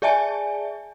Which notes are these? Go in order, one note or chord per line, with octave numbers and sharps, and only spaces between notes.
G#4 D5 E5 G#5 A5